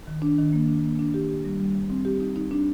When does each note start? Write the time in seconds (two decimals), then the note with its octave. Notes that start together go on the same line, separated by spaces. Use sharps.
0.07 D#3
0.22 D4
0.38 D#3
0.53 A#3
0.68 D4
0.83 A#3
0.99 D4
1.14 G4
1.29 G4
1.45 G3
1.60 G3
1.74 G3
1.90 C4
2.05 G4
2.20 D#4
2.36 D#4
2.51 D4